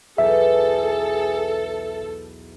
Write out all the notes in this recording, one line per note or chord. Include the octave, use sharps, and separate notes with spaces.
B1 E2 G#4 A4 E5